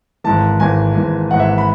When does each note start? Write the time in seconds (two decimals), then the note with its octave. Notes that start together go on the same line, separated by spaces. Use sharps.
0.24 G#1 G#2 E3 A5
0.60 G#1 G#2 E3 G#5
0.95 G#1 G#2 E3
1.31 G#1 G#2 E3 F#5
1.40 E5
1.58 B5